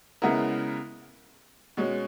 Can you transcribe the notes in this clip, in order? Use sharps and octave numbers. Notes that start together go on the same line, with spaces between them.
C#3 G#3 B3 E4 A#4
B2 G#3 C#4